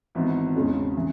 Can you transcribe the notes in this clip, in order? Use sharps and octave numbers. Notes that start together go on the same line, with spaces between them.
G#1 G#2 E3 B3
E1 E2 C#3 G#3 C#4
C#3 E3